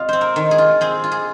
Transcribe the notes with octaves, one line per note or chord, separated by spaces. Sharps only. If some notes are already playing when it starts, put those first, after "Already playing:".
Already playing: C3 F4 D#5 F5
C4 C5
A#4
D#3
G#4
F4
C4 G#4
F4
G#4